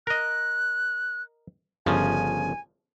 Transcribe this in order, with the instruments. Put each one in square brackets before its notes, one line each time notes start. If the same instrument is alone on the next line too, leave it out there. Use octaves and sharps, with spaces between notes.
[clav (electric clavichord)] A#4 D#5 [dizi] F#6
[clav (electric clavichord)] G1 C#3 F3 [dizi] G#5